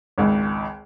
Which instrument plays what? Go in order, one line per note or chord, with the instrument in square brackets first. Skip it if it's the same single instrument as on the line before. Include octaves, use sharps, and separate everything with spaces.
[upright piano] G#1 C#2